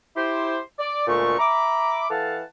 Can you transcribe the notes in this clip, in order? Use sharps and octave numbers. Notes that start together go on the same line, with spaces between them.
E4 G4 C5
D5
D2 A#2 G#3 A3 C#6
E5 A#5 B5 D6
E3 A4 F5 F#5 A5